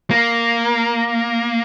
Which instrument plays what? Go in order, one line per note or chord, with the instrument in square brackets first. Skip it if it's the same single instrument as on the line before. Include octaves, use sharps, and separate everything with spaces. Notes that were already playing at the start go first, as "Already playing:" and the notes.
[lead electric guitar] A#3